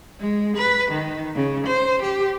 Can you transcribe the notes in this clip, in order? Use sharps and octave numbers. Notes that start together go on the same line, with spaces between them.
G#3
B4
D#3
C#3
C5
G4